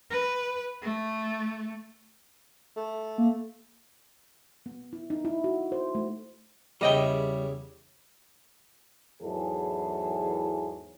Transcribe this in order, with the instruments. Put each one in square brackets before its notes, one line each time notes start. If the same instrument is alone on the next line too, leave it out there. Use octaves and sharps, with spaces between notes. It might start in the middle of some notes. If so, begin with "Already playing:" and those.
[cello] B4
A3
[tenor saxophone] A3
[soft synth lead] A#3
[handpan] B3
E4
D#4
E4
F#4
C5
A3
[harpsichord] E2 C#3 E4 [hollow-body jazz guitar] G3 D#5 G5
[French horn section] E2 G#2 E3 F#3 G#4 A4